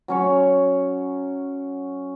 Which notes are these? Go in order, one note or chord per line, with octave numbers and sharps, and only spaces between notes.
F#3 C#4 C#5